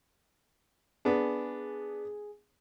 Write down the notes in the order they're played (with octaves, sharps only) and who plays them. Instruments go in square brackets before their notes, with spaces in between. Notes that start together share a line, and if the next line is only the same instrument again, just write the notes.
[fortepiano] B3 D4 [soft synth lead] G#4